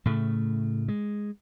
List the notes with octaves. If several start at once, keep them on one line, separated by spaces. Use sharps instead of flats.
A2 C#3 A3
G#3